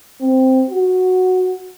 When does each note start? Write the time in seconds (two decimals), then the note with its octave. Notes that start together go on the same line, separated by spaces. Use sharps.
0.21 C4
0.70 F#4